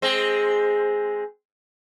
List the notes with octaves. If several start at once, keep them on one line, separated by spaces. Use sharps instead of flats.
G#3 C4